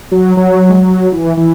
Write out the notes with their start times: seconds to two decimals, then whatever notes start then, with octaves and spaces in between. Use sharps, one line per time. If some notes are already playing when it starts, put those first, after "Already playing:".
0.12 F#3
0.37 F#3
0.70 G#3
0.74 F#3
1.12 E3
1.37 E3